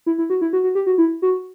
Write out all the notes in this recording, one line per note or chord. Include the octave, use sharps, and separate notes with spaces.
E4
E4
F#4
E4
F#4
F#4
G4
F#4
E4
F#4